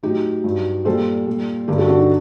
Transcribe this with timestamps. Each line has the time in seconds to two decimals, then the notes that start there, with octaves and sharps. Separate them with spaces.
0.03 A2 F#3 D#4 G4
0.44 G2 F#3
0.85 A#2 G3 A4 C5
1.26 A#2 G3
1.68 G2 D3 G3 G4 A#4
1.78 F#4 A4
1.89 D4 F#4
1.99 D#4